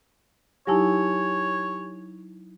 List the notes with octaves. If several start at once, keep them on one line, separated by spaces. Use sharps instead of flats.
F#3 D#4 E4 G4 C#5 G#5 A5